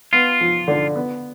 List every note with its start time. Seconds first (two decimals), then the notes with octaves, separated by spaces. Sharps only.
0.13 B3 F4
0.41 F3
0.68 D3
0.96 B3